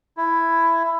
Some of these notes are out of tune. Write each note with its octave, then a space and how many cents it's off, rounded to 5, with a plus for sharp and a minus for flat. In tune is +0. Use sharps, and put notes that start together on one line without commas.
E4 +10